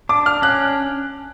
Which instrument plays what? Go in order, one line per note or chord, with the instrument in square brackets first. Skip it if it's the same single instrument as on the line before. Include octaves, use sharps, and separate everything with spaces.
[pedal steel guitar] D4 [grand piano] D6
[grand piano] F6
[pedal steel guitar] C#4 [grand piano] F#6